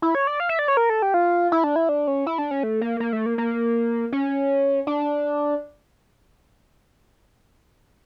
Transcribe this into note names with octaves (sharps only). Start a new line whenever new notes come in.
E4
C#5
D5
F5
E5
D5
C#5
A#4
A4
G4
F4
E4
D4
E4
D4
C#4
E4
D4
C#4
A3
A#3
A#3
A3
A#3
A#3
C#4
D4